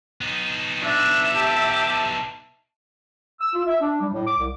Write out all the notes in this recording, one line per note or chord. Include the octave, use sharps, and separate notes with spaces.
B3 D#4
D4 E5
G4 A5
E6
F4
E5
D4
G3
A2
D6
C2